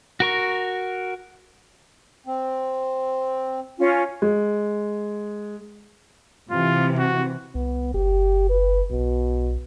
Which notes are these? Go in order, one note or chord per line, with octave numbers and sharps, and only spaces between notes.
F#4 A#4 C#6
C4
C#4 F4
G#3
C3 E3 F4
F#4
C2 B3
F#1 G4
B4
B1 B2